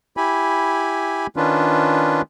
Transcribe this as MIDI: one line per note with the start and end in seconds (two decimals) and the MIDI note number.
0.17 1.27 64
0.17 1.27 67
0.17 1.27 80
0.17 1.27 83
1.36 2.22 51
1.36 2.22 61
1.36 2.22 62
1.36 2.22 65
1.36 2.22 71